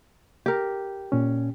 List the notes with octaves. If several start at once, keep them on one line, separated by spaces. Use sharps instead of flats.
G4 A#4
A#2 C#4